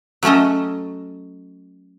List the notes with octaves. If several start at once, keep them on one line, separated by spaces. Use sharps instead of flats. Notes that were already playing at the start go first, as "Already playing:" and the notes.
F#3 A3 C#4 A4 D#5